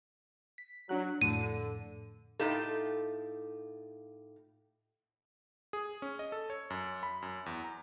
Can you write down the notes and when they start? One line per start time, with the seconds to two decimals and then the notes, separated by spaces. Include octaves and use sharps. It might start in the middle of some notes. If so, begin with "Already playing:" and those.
0.58 B6
0.89 F#3 D4 F#4 F#6
1.22 F2 A2 D3 D#7
2.39 A2 D#4 F4 G4 A4
5.73 G#4
6.02 C#4
6.19 D#5
6.32 A4
6.50 C#5
6.70 F#2
7.03 B5
7.22 F#2
7.46 E2
7.64 A#5